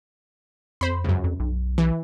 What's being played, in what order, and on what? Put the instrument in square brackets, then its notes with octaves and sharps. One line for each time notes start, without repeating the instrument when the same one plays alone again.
[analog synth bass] F2 [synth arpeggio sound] C5 B5
[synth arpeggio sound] C#2 F#2
[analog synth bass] F2
B1
[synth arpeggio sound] E3